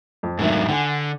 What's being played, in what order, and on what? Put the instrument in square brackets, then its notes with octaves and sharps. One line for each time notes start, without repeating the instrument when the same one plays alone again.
[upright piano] F2
[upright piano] D2 D#3 E5 [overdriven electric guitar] G#2 F#3
[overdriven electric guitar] D3 [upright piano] F#5 G#5